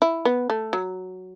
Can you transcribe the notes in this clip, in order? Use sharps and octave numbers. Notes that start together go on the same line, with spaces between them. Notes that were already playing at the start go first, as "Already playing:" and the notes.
E4
B3
A3
F#3